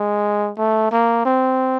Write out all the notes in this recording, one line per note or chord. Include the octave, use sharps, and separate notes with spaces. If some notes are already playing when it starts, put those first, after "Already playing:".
Already playing: G#3
A3
A#3
C4